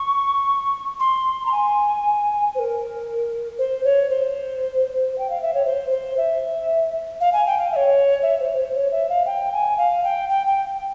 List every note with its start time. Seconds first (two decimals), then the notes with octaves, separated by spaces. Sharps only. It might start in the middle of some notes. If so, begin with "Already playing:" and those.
Already playing: C#6
1.00 C6
1.46 A#5
1.52 G#5
2.55 C5
2.59 A#4
3.59 C5
3.84 C#5
4.10 C5
5.18 G5
5.30 F5
5.42 E5
5.54 C#5
5.65 C5
5.90 C5
6.17 E5
7.21 F5
7.33 G#5
7.46 G5
7.58 F5
7.72 E5
7.76 C#5
8.23 E5
8.40 C5
8.57 C5
8.75 C#5
8.92 E5
9.09 F5
9.26 G5
9.53 G#5
9.78 F5
10.04 G5
10.29 G5
10.47 G5